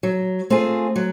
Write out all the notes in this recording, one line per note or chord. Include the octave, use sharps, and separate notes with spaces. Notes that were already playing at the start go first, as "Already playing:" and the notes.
F#3
A3 C4 F4 G#4
F#3